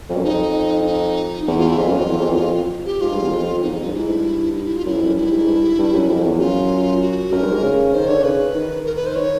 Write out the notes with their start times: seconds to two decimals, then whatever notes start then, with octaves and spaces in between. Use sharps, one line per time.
0.09 F2
0.17 F#2
0.24 F2 D#4
0.86 D#4
1.47 E2 E4
1.58 F4
1.68 E4
1.77 F2 F4
1.88 F#2
1.99 F2
2.08 E2
2.20 F2
2.29 E2
2.39 F2
2.86 G4
3.01 G#2 F4
3.11 G2
3.22 E2
3.32 F2
3.62 E2 D#4
3.73 F2
3.83 G2
3.93 G#2 F4
3.97 E4
4.08 G2
4.55 D#4
4.65 E4
4.76 F4
4.86 F#2 E4
4.96 F2
5.06 F#2
5.16 G2 E4
5.31 G#2
5.47 G2
5.78 G2
5.93 F#2
6.09 F2
6.24 E2
6.39 F#2 F4
7.01 F#4
7.32 F#2 A#4
7.42 G2
7.51 G#2
7.62 C#3
7.93 D#3 C5
8.08 D3 C#5
8.19 D3
8.24 C#3 B4
8.55 D#3
8.85 A#4
8.96 B4
9.06 C5
9.16 D#3 C#5